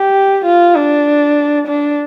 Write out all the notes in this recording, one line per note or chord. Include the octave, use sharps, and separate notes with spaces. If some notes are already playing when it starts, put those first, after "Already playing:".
Already playing: G4
F4
D4
D4